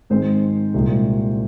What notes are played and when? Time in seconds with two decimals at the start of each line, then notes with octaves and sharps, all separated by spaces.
0.10 G#2 D#3 G#3 C4 C5
0.74 C2 A#2 G#3